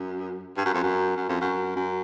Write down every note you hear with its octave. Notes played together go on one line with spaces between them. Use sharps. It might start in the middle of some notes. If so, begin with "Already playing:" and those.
Already playing: F#2
G2
F#2
F2
F#2
F#2
F2
F#2
F#2